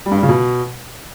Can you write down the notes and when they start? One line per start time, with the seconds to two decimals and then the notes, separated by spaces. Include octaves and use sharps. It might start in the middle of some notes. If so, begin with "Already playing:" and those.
0.06 G3
0.11 G2
0.17 G3
0.23 C#3
0.29 B2